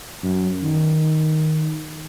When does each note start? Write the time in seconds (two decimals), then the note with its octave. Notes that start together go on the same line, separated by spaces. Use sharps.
0.23 F#2
0.63 D#3